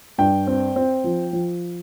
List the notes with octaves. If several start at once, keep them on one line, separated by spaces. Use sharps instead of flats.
G2 G5
C4
C4
F3
F3